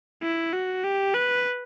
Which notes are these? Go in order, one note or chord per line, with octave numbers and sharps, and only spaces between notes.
E4
F#4
G4
B4